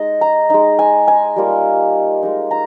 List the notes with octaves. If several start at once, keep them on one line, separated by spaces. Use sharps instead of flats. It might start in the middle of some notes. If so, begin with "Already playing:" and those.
Already playing: G#3 D#4 D#5
A#5
G#3 D#4
G#5
G#5
G3 A#3 F4
G#3 D#4
A#5